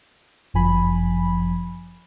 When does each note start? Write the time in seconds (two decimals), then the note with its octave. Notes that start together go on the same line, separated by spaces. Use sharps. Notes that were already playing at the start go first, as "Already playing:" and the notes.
0.54 G1 F#2 F3 G#5 B5